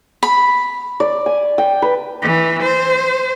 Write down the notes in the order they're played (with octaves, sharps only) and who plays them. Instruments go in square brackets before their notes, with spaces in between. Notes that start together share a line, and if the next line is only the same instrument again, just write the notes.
[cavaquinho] B5
[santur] D5
G#5
G5
B4
[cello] E3
C5